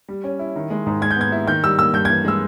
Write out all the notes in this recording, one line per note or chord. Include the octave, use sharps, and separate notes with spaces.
G3
C#4
E4
D#3
G#3
G#2
G#3 G#6
G6
B3 G#6
E4
D#3 G6
G3 E6
A#3 E6
G2 G6
E3 G#6
G#3 E6